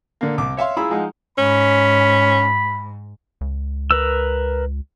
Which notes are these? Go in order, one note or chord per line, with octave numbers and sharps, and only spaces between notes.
D3 A#3
C2 D6
C#5 E5 F5 C6
E4 F4 G#4 A#5 B5 E6
F3 G#3 D#4 F#5
G#2 C#4 B5
C#2
A#4 B4 E6